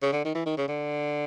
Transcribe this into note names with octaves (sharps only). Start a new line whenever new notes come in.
C#3
D3
D#3
E3
D#3
C#3
D3